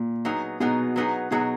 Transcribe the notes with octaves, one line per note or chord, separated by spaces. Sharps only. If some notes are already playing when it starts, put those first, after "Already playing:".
Already playing: A#2
F#3 B3 D#4 G#4
B2 F#3 B3 D#4 G#4
F#3 B3 D#4 G#4
B2 F#3 B3 D#4 G#4